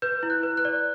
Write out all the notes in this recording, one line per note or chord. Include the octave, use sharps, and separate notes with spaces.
B4 G6
E4
F#6
B4
F#6
D5